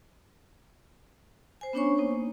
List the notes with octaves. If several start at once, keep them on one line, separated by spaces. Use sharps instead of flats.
C5 G#5
B3 C#4 D4 C5 C#5 C#6
A#3 D#4 C5